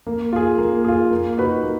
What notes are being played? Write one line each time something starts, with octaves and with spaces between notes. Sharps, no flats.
A#3
F4 G#4
A#3
F4 G#4
A#3
D#4 F#4 B4
A#3